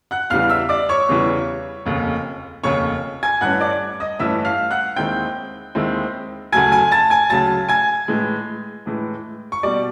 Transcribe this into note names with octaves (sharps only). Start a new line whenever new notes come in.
F#5 F#6
E2 C#3 E3 G3 F5 F6
E5 E6
D5 D6
C#5 C#6
E2 C#3 E3 G3
F1 D#2 C#3
F1 D#2 C#3 C#5 C#6
G#5 G#6
A1 G2 E3 A3 C#4 F#5 F#6
D5 D6
D#5 D#6
A1 G2 E3 A3 C#4 E5 E6
F5 F6
F#5 F#6
D#2 D#3 G#3 C4 E4 G5 G6
D#2 D#3 G#3 C4 E4
D2 C#3 F#3 A3 G#5 G#6
G#5 G#6
A5 A6
G#5 G#6
D2 C#3 F#3 A3 A5 A6
G#5 G#6
A2 E3 G#3
A2 E3 G#3
C#6
B2 G3 D5 D6